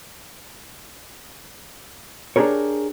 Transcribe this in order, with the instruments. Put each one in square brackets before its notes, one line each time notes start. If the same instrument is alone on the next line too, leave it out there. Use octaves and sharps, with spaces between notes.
[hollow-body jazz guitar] D4 G4 G#4 A#4 C#5